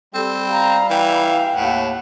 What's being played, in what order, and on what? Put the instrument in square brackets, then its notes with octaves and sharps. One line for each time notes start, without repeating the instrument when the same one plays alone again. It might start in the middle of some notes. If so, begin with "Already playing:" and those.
[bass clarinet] G3 [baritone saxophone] C4 [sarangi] G4 [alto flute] A4
[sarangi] F5 [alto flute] A#5
[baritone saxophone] E3 [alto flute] G5
[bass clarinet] D#2 [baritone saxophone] A2 [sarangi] F#5